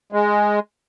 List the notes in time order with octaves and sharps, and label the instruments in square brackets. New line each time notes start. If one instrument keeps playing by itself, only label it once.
[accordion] G#3